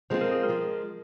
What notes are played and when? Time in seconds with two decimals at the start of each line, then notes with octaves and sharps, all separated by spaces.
0.10 F3 G#3 C4 F4 C5
0.21 A#4
0.31 G#4
0.43 A#4
0.49 F3 G#3